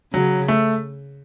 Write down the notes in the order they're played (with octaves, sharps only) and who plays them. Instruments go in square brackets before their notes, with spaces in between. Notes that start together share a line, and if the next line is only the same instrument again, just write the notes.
[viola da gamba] C#3 [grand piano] F#3
[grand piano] A3